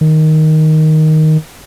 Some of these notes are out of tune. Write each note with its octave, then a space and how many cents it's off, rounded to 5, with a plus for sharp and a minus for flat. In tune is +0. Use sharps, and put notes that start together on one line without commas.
D#3 +5